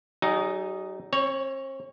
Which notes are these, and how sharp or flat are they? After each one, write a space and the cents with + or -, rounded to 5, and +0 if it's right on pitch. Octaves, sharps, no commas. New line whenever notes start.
F#3 +45 D#4 +0 G#4 +0
C4 +45 C#5 +5